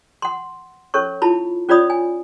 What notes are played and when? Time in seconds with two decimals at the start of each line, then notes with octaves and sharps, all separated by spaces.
0.22 F#5 C6
0.94 C#4 A4 C#5 C#6
1.22 E4 F4 A5 B5
1.69 C#4 F4 C#5 D5 B5 D#6
1.90 G#5